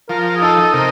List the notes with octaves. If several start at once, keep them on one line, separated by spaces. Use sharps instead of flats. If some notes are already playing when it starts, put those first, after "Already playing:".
F3 A#4
G#4
D#4 A4
C3 A#4